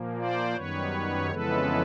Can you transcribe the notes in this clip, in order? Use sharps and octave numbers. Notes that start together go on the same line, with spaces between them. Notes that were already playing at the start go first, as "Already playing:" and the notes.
Already playing: A#2 F3 A#3
C5 D5
F#2 D#3 G3 B3 B4 C#5
F2 C#3 E3 G#3 B3 A4 B4